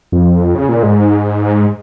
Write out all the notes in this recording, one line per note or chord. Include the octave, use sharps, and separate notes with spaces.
F2
C#3
A#2
G#2